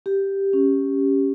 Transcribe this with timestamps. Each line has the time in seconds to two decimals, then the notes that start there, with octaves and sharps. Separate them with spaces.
0.06 G4
0.53 C#4